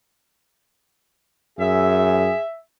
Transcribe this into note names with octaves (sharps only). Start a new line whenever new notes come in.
F#2 G#4 E5